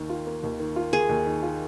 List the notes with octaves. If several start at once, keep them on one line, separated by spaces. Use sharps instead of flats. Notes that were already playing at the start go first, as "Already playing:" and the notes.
Already playing: D#2 D#3
F4
A#3
D#2
D#3
F4
A#3 G#4
D#2
D#3
F4